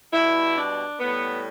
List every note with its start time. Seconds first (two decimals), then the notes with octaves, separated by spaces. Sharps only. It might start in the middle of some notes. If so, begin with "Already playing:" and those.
0.13 B2 G3 E4
0.56 D4
1.00 A2 G3 B3